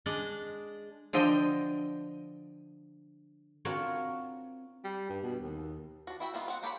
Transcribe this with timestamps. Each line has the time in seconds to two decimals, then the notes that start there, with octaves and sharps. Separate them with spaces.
0.06 G#3 D4 D5 D#5
1.13 D3 F3 D4 D#5 G5
3.65 C4 D4 F4 F#4 A#4 C#5
4.84 G3
5.09 G2
5.23 B2
5.41 D#2
6.07 D4 F#4
6.20 E4 F#4 E5 G5 B5
6.34 D#3 G3 A#3 B3 F4
6.48 C4 F#5
6.63 A#3 G4 A4 C#5 B5